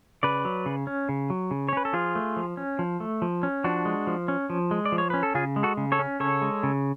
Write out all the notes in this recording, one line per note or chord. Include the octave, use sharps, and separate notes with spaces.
C#3 B4 D5
F#3
C#3
C#4
C#3
F#3
C#3
C#5
C#4 B4
A4
F3 F4 G#4
A3
F3
C#4
F3
A3
F3
C#4
F3 D4 F#4
G#3
F3
C#4
F3
G#3
D5
F3
C#5
C#4 B4
A4
C#3 F4 G#4
G#3
F#4 A4
C#3
A4 C#5
C#4
C#3 A4 C#5
G#3
C#3